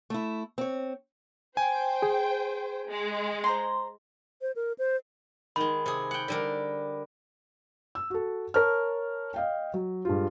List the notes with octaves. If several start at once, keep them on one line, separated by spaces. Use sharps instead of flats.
A3 E4
C4 C#5
C5 G5 G#5
G#4
G#3
C5 A#5 C6
C5
A#4
C5
D#3 G#3 B5
C3 G#4
F#5 G5
D3 G3 A#4
E6
F#4 A4
A#4 C#5 A5 F6
D#5 F5 G5
F#3
G2 G#3 F4